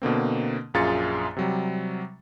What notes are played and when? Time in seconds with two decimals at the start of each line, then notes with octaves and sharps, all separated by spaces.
0.02 B2 D3 A#3 C4
0.74 A#1 F#2 F4 G#4 A6 C#7
1.36 C3 F#3 G3